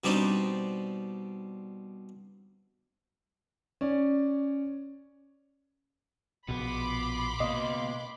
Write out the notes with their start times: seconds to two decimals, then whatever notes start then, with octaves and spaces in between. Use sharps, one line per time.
0.04 B2 G3 C4 D4 D#4
3.81 C#4 D5
6.48 A#1 B2 B3 B5 C6 D6
7.40 C#2 B2 A#3 D#5 F5